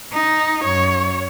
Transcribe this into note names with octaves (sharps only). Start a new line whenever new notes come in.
D#4
F#2 C#5